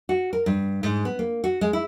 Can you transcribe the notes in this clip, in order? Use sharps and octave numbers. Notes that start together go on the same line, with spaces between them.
F#4
A#4
G2
G#2
B3
A#3
F#4
G#3
E4